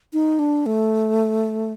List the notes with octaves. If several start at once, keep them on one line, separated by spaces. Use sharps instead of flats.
D#4
D4
A3